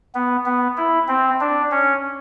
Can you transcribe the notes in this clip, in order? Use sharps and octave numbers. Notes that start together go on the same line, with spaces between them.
B3
B3
E4
C4
D4
C#4